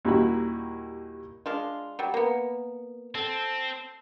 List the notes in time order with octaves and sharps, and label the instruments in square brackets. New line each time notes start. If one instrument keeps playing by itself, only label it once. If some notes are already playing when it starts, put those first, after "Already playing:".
[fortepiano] D#2 A#2 G3 E4 F#4 B5
[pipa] G#3 D4 F4
F#3 G3
A#3 B3
[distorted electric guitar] C4 [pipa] A4